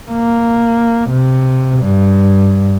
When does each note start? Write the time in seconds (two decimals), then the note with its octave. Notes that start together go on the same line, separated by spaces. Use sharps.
0.11 A#3
1.10 C3
1.79 G2